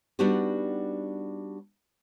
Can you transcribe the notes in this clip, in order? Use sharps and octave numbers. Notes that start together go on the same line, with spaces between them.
G3 B3 D4 D#4 F#4 G4